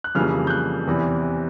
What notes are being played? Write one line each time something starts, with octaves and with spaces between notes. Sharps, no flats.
F#6
F2 C#3 E3 G3 A#3 F6
G6
F#6
E2 C3 E3